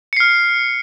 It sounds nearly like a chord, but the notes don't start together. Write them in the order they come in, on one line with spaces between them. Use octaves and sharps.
C#7 C7 F6